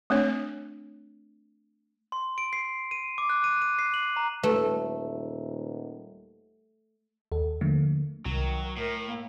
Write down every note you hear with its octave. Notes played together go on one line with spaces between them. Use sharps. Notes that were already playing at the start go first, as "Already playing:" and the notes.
A3 C4 D4 C#5
C6
D7
C7
D#7
D6
F#6
D#7
D#7
C7
F#7
A#5
D#1 A3 B4
D#2 A4
D3 F3 A3 A#3
C2 D#3 F#3
A2 A#4
A#3